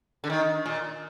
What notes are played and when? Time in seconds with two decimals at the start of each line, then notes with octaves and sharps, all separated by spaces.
0.24 D3
0.30 D#3
0.66 A#2